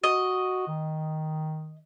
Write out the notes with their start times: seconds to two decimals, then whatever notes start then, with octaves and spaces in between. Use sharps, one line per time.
0.04 F#4 D#5
0.68 D#3